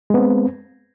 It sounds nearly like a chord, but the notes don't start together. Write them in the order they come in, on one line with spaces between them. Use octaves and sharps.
G#3 B3 C4